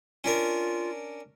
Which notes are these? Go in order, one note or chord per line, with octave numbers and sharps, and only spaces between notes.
C#4 D4 F4 A#4